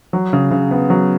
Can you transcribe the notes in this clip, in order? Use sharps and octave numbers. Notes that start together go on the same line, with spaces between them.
F#3
C#3
C#3
B3
F#3